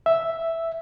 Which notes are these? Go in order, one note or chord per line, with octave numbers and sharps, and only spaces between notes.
E5